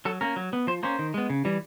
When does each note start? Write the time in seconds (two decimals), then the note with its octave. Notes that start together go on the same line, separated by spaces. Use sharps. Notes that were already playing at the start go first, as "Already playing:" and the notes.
0.05 F#3 A4
0.21 A#3 C#4 A#4
0.36 F#3
0.53 B3
0.67 F3 C5
0.83 A#3 C#4 C5
0.99 D#3
1.14 G#3 B3
1.30 C#3
1.45 E3 G3